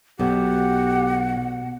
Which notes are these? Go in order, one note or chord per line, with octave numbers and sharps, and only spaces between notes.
B1 B2 G4 F#5